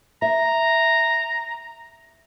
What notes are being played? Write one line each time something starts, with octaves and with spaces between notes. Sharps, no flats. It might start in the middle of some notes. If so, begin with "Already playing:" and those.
E5 A#5